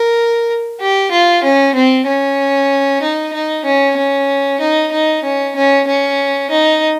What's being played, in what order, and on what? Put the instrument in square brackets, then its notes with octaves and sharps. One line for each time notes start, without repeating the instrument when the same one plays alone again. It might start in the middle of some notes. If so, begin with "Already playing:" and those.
Already playing: [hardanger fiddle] A#4
G4
F4
C#4
C4
C#4
D#4
D#4
C#4
C#4
D#4
D#4
C#4
C#4
C#4
D#4